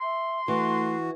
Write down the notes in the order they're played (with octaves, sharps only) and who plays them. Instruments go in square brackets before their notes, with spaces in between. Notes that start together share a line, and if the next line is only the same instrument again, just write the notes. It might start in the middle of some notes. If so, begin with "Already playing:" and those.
[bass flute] E5 [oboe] C6
[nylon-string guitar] E3 [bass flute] A3 [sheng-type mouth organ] F#4